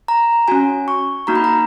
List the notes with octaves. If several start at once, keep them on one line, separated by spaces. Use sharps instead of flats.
A#5
C#4 F#4 G#5
C#6
A#3 D#4 F#4 A#5
B5
A#5